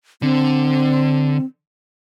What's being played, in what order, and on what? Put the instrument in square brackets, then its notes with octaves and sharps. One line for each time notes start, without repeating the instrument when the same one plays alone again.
[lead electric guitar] D3 [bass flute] C4